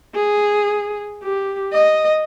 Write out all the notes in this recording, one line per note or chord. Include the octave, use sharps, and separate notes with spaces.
G#4
G4
D#5